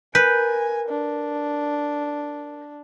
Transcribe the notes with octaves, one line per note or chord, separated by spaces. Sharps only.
A#4 B4 G#5 G6
D4